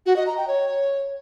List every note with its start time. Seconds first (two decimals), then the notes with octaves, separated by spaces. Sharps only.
0.06 F#4
0.16 D#5
0.27 A#5
0.37 G5
0.48 C#5